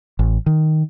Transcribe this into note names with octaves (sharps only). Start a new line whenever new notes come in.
A1
D#3